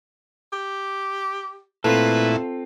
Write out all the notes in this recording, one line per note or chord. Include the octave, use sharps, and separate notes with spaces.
G4
A#2 A3 C4 E4 F4 A4 B4